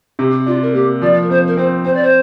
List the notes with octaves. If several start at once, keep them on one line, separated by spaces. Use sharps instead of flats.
C3 G4
D4 F4
A#4
A#3 G4
F3 D5
A#4
F2 C5
A#4
C4 C5
C4 C5
D5
C5